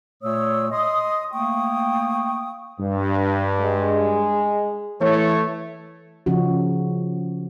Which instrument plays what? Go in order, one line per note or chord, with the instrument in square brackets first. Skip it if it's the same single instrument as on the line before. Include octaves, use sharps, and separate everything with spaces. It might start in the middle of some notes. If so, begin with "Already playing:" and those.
[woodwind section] A#2 A3 C#5 D#6 E6
D#5 C6 D#6
A3 A#3 G5 C#6 D#6
[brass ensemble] G2
[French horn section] G#3
[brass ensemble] E3 A3 C#5
[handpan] C#3 F3 C#4 D#4 F#4